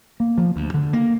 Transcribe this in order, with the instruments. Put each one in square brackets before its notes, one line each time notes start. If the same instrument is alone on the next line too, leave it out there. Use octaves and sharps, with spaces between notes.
[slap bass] A#3
F3
D2
D3
A#3